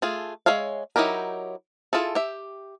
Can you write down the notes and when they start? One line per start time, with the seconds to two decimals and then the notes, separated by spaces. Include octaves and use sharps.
0.02 A3 F4 G#4
0.46 G#3 G#4 C#5 E5 F5
0.96 F#3 D#4 E4 G4 A#4
1.93 E4 F4 G#4 A4
2.15 G4 E5